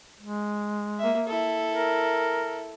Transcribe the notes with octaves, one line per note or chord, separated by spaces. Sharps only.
G#3
A#3 E5
E4 A4
A#4